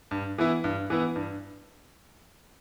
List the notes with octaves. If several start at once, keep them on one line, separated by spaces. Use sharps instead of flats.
G2
E3 B3 E4
G2
E3 B3 E4
G2